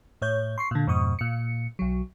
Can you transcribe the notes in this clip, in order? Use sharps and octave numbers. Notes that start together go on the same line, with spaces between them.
A2 C#5 G6
C6 C#6 C7
A#2 D3
F2 G#2 B2 C#6 D#6
A#2 C#7
B1 F#3